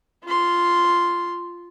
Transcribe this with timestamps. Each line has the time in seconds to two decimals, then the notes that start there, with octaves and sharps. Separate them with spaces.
0.24 F4 C6